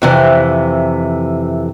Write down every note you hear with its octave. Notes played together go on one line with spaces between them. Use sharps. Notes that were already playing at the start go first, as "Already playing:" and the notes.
F2 C3 E3